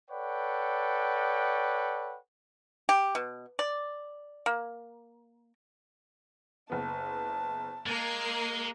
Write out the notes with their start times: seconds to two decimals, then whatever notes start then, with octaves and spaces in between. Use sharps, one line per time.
0.10 A4 B4 C#5 D5 F#5 G5
2.89 G4
3.15 B2
3.59 D5
4.46 A#3
6.70 F#1 B3 A5
7.86 G#3 A#3 A#4 A6 C7